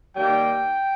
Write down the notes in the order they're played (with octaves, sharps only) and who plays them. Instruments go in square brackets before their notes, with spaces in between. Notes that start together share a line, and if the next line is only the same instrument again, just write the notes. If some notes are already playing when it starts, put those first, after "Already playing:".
[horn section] D#3 G3 A#3 G5